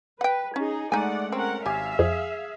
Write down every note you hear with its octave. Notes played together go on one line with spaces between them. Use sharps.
B4 F#5 G5
C#4 D#4 G#4
G#3 A3 D#4 D5 F#5 G#5 D#7
C4 C#4 A#4 F#5
G#1 G4 E5 F5 G#5
F2 G#4